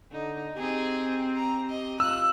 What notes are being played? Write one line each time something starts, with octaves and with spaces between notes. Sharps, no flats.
D3 D#4
C4 D#4 G4 G#4
A#5
D#5
F4 E6 F#6